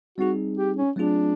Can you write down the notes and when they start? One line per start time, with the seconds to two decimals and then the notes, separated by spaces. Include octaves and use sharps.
0.18 G3 C4 D#4 F#4 G#4
0.57 G4
0.77 C#4
0.96 F#3 A3 C4 D4 F4 G#4